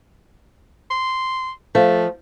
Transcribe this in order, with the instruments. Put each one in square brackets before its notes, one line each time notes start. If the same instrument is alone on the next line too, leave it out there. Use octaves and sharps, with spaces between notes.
[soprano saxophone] C6
[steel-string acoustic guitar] F3 [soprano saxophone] A3